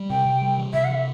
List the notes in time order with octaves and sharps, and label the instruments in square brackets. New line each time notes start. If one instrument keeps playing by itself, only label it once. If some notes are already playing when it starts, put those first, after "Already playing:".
Already playing: [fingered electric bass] G3
[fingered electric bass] C3 [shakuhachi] G5
[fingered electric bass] C3
G3
E3
[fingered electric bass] C3 [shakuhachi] E5
[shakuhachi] F#5
[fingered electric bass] E3 [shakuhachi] E5